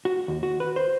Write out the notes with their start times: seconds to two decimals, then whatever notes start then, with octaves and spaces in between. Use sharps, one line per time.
0.05 F#4
0.28 D#2
0.43 F#4
0.60 B4
0.76 C5